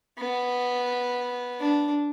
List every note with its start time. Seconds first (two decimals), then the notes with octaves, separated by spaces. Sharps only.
0.18 B3
1.60 D4